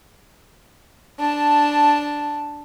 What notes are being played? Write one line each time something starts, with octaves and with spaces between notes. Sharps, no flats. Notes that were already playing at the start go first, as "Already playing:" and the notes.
D4 A5